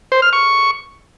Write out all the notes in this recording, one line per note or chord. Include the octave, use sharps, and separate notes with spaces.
C5
F6
C#6